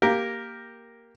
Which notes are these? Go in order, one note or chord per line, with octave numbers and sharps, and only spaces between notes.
A#3 G4 A#4